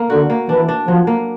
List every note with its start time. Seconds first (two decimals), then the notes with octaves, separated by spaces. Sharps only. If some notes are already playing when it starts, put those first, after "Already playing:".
Already playing: A#3
0.09 D3 F#4
0.30 A#3
0.48 E3 D4
0.69 D4
0.88 F3 F#3
1.07 A#3